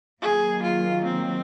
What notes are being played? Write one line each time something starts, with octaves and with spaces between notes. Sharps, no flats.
D#3 F#3 A#3 G#4
F4
C4